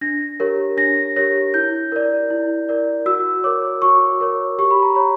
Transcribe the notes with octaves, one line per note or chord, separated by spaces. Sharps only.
D4 A#6
G4 A#4 C#5
D4 A#6
G4 A#4 C#5 A#6
E4 G6
A#4 D5
E4
A#4 D5
F#4 E6
A#4 C#5 D6
F#4 C#6
A#4 C#5
G4 C#6
B5
A#5
C#5 B5